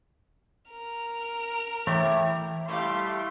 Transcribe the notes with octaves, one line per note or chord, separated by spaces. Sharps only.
A#4 F6
E3 A3 E4 G4
G3 A3 E4 G4 D#5 F5 C6